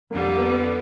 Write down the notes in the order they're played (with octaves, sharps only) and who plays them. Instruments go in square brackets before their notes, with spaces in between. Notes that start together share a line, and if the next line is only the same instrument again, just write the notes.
[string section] F2 D3 G3 [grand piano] A#3
[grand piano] A#3
B3
B3